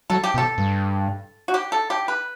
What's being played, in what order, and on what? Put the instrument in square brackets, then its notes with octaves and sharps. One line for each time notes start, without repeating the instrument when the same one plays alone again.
[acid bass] F#3 [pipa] A4
[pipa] G4
[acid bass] B2
[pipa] A4
[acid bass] G2
[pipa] F#4
G4
A4
G4
B4